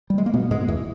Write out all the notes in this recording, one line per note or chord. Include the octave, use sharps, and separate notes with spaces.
G3
G#3
A#3
B2 B3
G#2 G#3
E2 E3